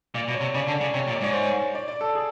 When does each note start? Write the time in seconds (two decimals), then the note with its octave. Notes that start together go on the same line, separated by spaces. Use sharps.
0.15 A#2 D5
0.28 B2
0.34 C#5
0.41 C3
0.55 C#3 D5
0.67 D3
0.74 D5
0.81 C#3
0.94 C3 C#5
1.08 A#2
1.15 D5
1.21 G#2 C#5
1.33 C5
1.43 C#5
1.75 D5
1.88 D5
2.01 A4
2.15 G#4